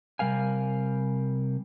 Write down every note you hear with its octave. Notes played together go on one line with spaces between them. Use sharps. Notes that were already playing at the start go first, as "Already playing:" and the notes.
C3 G3 A#4 F5 G#5